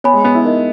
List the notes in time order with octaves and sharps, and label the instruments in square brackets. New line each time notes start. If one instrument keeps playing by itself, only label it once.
[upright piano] B3 [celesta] C#5 G#5 B5
[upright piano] G#3
B3
E4
[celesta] D#4 A#4 D#5